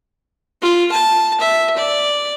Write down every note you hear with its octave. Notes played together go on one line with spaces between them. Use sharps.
F4
A5
E5
D5